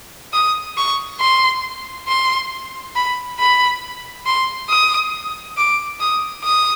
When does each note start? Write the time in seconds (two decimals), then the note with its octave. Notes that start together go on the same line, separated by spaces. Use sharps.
0.33 D#6
0.77 C#6
1.20 C6
2.08 C6
2.96 B5
3.39 B5
4.26 C6
4.70 D#6
5.57 D6
6.00 D#6
6.44 D#6